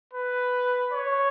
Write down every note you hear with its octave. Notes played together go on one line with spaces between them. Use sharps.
B4
C#5